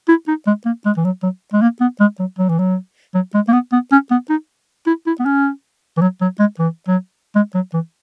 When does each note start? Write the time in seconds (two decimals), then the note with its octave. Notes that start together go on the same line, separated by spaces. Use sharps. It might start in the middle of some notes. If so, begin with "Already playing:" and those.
0.08 E4
0.28 D#4
0.47 G#3
0.65 A#3
0.85 G#3
0.97 E3
1.04 F#3
1.23 F#3
1.53 G#3
1.61 A#3
1.80 B3
2.00 G#3
2.19 F#3
2.38 F#3
2.49 E3
2.58 F#3
3.14 F#3
3.34 G#3
3.48 A#3
3.52 B3
3.72 B3
3.91 C#4
4.11 B3
4.29 D#4
4.86 E4
5.06 E4
5.19 B3
5.25 C#4
5.97 E3
6.01 F#3
6.21 F#3
6.39 G#3
6.59 E3
6.87 F#3
7.35 G#3
7.54 F#3
7.73 E3